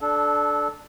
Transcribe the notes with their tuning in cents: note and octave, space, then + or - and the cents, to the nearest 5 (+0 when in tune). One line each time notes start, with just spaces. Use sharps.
D4 +0 A4 -20